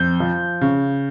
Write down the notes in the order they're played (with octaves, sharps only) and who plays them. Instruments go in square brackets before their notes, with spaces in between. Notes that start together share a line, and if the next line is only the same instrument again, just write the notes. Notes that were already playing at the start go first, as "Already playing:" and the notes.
Already playing: [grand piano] F2 G6
F3
C#3